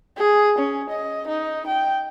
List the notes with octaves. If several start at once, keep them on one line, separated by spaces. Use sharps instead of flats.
G#4
C#4
D#5
D#4
G5